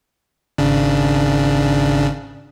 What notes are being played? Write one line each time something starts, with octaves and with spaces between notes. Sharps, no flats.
G#1 C#3 D4